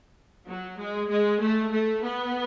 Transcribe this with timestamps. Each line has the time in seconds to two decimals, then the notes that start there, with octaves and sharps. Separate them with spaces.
0.47 F#3
0.78 G#3
1.09 G#3
1.41 A3
1.71 A3
2.03 B3